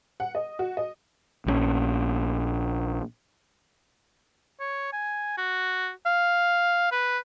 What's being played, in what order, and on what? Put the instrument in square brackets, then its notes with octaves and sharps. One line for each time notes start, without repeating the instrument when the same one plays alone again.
[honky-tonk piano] F#5
D#5
F#4
D#5
[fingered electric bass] A#1 F3 C#4
[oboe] C#5
G#5
F#4
F5
B4